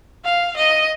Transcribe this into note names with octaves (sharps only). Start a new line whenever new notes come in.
F5
D#5